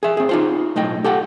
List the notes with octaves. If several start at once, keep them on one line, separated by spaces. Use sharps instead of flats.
G#4 E5
C4 G#4
D#4 F4 C5
B1 A2 D#5 G5
G4 A4 F#5 G5